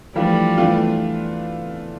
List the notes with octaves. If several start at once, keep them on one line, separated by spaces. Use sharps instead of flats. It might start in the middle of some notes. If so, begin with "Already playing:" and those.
E3 F3 G3 A3 D4 F4
E3 A3 D4 F4